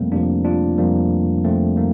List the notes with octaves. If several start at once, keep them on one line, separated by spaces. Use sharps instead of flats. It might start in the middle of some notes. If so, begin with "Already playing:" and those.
Already playing: F2 C3 F3 G3 A3 A#3 C4
F2 C3 F3 A#3 D4
D4 F4
F2 C3 F3 G3 A#3
F2 C3 F3 A3 C4
G3 A#3